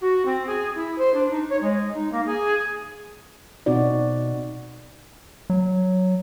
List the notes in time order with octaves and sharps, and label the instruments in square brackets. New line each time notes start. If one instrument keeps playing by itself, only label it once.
[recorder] F#4
C4
G#4
E4
C5
D4
D#4
C#5
G#3
D#4
A#3
G#4
[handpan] B2 C4 D#4 F#4 D5
[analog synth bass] F#3